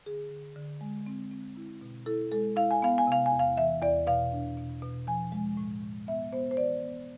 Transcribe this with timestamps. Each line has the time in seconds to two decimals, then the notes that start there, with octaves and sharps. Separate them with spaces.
0.06 D3 G#4
0.31 D3
0.56 D3
0.81 G#3
1.06 C4
1.31 C4
1.57 E4
1.81 B2
2.06 E4 A4
2.32 G#3 A4
2.56 E4 F5
2.71 G#5
2.82 B3 F5
2.98 G#5
3.07 C3 F5
3.26 G#5
3.32 E2
3.39 F5
3.57 E3 E5
3.82 E2 D5
4.07 B2 F5
4.32 D4
4.57 B2
4.83 B2
5.07 F3 G#5
5.32 G#3
5.57 A2
5.82 A2
6.07 B3 E5
6.33 B3 C5
6.51 C5
6.57 E3 D5
6.83 B3